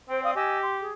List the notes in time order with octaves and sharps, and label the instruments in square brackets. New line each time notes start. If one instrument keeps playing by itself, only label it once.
[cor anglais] C4 [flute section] C5 G5
[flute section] D5 F5 D#6
[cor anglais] G4 [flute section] D#5 G#5 E6
[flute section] C6
G#4